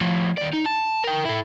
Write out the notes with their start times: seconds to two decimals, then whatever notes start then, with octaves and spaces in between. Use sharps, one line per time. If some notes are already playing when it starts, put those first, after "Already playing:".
0.01 A2 F3
0.38 D#2 D5
0.53 D#4
0.66 A5
1.04 A#4 G5
1.25 E4 A4